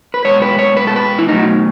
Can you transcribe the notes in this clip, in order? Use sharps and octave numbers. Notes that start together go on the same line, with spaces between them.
B4
B2 G#3 C#5
B4
C#5
B4
A4
B4
E4
B2 F#3 A3 D#4